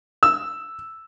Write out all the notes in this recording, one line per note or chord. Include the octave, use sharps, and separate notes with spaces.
E6